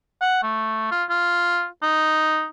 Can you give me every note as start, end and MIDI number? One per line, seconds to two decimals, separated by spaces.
0.21 0.42 78
0.43 0.91 57
0.91 1.04 65
1.10 1.67 65
1.82 2.47 63